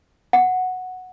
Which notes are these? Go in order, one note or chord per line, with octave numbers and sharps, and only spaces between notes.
F#5